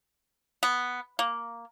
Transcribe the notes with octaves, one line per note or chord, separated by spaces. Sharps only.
B3
A#3